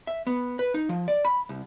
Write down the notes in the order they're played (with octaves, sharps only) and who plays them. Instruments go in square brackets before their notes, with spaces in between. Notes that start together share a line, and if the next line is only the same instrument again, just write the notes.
[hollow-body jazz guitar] E5
B3
B4
D#4
F3
D5
B5
C2